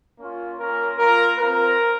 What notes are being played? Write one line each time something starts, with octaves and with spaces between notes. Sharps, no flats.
A#3 C#4 F4
A#3 C#4 F4 A#4
A#3 F4 A#4
C4 F4 A#4